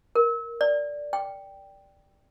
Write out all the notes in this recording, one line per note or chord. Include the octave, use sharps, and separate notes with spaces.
A#4
D5
G5